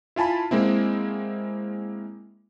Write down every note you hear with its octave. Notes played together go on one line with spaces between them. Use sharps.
E4 F4 G#5 A5 B5
G#3 A#3 C4 E4